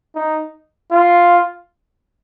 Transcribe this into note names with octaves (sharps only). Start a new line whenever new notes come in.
D#4
F4